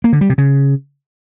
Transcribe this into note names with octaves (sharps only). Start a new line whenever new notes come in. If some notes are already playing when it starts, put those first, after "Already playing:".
A#3
D3
G3
C3
C#3